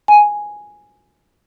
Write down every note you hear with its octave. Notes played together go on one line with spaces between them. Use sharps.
G#5